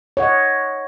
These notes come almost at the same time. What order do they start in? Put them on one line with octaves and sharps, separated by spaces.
C#5 F#5 D#5